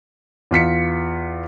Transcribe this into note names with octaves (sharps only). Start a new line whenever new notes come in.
E2 F4 B6 C#7